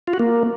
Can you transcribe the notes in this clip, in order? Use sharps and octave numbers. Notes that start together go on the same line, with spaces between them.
F4
F#4
A#3